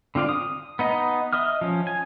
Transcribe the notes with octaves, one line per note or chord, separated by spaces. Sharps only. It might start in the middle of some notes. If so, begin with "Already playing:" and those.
D3 C4 F4 D5 F5
D#6
B3 D#4 D#5
D#5 E5 D#6 F6
F3 C#4
G#5